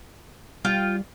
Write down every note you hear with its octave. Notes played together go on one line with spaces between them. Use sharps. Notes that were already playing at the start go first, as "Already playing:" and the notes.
G3 F4 G5